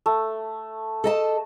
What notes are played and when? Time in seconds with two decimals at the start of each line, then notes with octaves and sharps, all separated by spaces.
0.06 A3
1.04 A4 D#5 A5